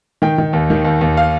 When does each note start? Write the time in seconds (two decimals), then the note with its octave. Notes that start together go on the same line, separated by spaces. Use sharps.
0.22 D#3 G5
0.38 D#3
0.53 D#2
0.70 D#3
0.85 D#2
1.01 D#2
1.17 F5